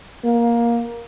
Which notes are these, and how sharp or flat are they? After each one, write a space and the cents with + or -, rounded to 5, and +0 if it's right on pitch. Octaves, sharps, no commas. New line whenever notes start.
A#3 +10